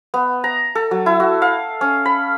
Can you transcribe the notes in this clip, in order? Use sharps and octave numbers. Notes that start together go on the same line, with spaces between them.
B3
A#5
A4
F#3
E4
F#4
F5
C#4
B5